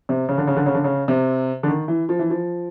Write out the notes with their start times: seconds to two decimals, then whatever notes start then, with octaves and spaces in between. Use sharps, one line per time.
0.09 C3
0.29 C#3
0.38 D3
0.47 C#3
0.57 D3
0.66 C#3
0.75 D3
0.84 C#3
1.08 C3
1.63 D3
1.68 D#3
1.88 E3
2.09 F3
2.19 E3
2.30 F3